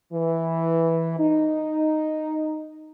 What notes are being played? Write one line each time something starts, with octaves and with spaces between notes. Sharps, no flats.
E3
D#4